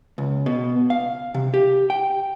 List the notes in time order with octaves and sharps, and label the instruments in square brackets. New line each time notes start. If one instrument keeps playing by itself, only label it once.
[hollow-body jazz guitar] C#2
B2
F5
C3
G4
G5